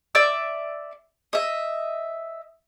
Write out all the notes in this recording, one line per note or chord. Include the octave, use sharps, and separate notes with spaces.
D5 E5 E6
D#5 E5